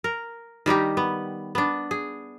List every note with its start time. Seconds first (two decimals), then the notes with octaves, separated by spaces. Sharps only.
0.04 A#4
0.66 D#3 G3 D#4 G4
0.97 B3
1.55 B3 D4
1.91 G#4